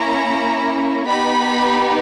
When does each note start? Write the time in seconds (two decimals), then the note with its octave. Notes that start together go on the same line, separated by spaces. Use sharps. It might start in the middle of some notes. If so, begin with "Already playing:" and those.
Already playing: A#3 C#4 E4 A#5
1.06 B3 D#4 G4 B5